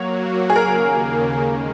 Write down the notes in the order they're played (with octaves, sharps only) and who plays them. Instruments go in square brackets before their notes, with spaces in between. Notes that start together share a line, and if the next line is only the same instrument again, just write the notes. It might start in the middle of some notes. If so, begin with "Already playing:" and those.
Already playing: [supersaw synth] F#3 A#3 F#4 [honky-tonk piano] C#5
[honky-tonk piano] G#4
[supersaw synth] D#2 C#3 A#3 [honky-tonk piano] A#4
[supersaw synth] D#3 G#3 C#4